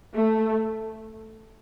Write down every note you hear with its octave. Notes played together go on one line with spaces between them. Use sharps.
A3